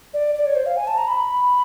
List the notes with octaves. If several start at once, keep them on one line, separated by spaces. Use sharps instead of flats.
D5
D5
C#5
C5
F5
G#5
A5
A#5
B5